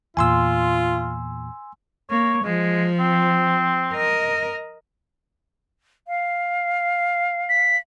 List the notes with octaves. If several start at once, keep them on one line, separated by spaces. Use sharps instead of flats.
E2 A#2 F4 G#5 C6 E6
A#3 C#5
F3 G#3
C4
A#4 D#5
F5
B6